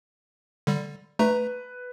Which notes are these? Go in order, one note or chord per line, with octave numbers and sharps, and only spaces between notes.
D3 G3
A3 B4 A#5